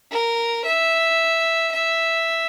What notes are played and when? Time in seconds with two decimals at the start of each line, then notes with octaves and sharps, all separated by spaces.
0.11 A#4
0.64 E5
1.72 E5